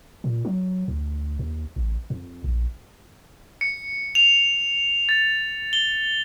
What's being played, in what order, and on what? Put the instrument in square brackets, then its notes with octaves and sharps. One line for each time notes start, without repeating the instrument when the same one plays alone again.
[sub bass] A#2
F#3
D2
D#2
A1
F2
A#1
[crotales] C#7
F7
A6
G7